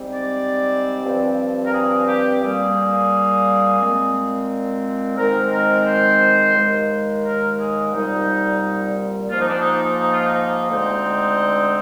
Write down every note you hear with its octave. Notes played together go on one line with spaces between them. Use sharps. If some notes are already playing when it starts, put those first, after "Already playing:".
Already playing: G#2 G3 C4
D5
G2 F3 C4
A#4
G#4
G4
A#2 G3 A#3 G#4
A#2 G#3 C4
G#2 D#3 G#3 C4 A#4
A#4
C5
D#2 D#3 G#3
A#4
G#4
C2 A#2 G3 D#4
G#2 F3 A#3 F4
D#4
D4
D#4
D#4
F4
D#4
D2 D3 G#3 C4